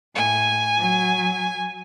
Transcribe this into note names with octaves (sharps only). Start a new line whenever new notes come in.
A2 G#5
F#3